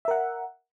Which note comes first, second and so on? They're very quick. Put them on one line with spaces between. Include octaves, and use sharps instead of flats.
E5 A#4 F#5